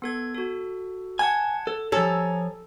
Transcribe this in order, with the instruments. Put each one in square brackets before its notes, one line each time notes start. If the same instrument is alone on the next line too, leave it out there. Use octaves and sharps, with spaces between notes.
[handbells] B3 A4 G#6
F#4 A4
[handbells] F#5 A5 G#6 [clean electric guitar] G#5
[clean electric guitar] A4
[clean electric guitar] F3 C#5 [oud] A4 [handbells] G#5 A#5 A6